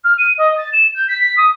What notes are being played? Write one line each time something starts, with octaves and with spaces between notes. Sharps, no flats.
F6
D#7
D#5
A6
E7
G6
B6
B6
D#6